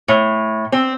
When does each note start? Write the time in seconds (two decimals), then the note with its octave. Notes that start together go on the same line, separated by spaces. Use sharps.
0.08 A2
0.72 C4